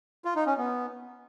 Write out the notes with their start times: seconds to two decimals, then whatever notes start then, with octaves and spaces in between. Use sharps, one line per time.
0.25 F4
0.36 D#4
0.47 C#4
0.57 B3